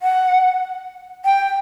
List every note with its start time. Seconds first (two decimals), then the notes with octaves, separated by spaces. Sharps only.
0.03 F#5
1.25 G5